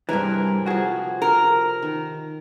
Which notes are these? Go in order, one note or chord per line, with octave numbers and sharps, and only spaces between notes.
G2 C3 E3 G#3 A#4 G#5
F3 F#4 G#4 A5
A#4
D#3